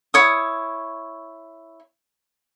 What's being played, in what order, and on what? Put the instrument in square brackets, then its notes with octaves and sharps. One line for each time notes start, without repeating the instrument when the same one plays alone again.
[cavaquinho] E4 C#5 D#6